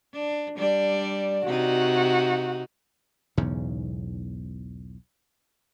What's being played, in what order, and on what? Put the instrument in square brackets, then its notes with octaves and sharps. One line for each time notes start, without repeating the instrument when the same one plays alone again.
[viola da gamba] D4
G3 D4 D5
[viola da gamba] C3 D#4 [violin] F#4
[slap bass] B1 E2 G#2 C#3